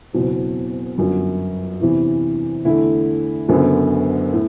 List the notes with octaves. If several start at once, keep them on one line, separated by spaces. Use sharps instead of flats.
F#1 E2 B2 F#3 C4
G1 F#2 F#3
E2 C3 E3
E2 D3 A3 E4
F#1 F#2 D3 F#3 B3
A2